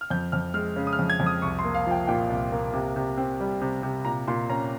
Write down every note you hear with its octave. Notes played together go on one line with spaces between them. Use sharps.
F6
F2 G6
F2 F6
G#3 F6
C#3
D#6
F6
F2
G#6
F2
D#6
C2 C#6
C6
A#3
F5
F3 G5
A#2 G5
C2
A#3
C3
C3
C4
G3
C3
C3
A#2 A#5
A#2 C6
C#4 A#5